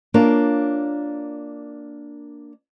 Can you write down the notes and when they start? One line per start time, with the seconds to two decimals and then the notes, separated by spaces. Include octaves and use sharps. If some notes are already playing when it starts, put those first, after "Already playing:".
0.14 A#3 D4 F4 A#4 C#5